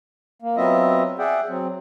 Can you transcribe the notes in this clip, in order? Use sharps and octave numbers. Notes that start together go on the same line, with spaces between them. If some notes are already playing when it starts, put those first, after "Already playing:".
A#3
F#3 B3 C4 F4 D#5 E5
G#4 D5 E5 F#5 G5
F#3 C4